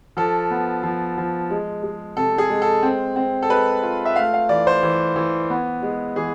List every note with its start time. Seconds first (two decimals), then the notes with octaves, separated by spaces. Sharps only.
0.17 F3 A4
0.51 B3
0.83 F3
1.18 F3
1.50 G#3
1.83 G#3
2.17 C3 A4
2.38 G#4
2.49 G#3
2.62 A4
2.83 C4
3.16 C4
3.42 A4
3.49 G#3 B4
3.83 F4
4.05 E5
4.16 A3 F5
4.34 F5
4.49 E3 D5
4.67 C5
4.83 E3
5.16 E3
5.50 B3
5.82 G#3
6.16 E3 G#4